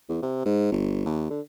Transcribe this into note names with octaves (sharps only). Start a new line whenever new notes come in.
E2
C3
G#2
G1
D#2
D3